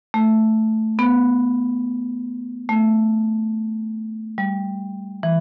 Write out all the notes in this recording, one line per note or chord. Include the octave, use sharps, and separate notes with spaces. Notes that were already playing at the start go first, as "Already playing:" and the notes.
A3
B3
A3
G3
E3